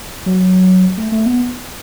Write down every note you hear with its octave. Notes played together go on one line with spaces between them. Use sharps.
F#3
A3
A3
B3